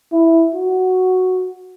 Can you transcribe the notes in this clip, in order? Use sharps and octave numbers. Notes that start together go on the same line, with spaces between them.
E4
F#4